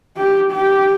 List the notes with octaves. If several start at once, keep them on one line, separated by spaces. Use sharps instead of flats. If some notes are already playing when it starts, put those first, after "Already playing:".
G4
G4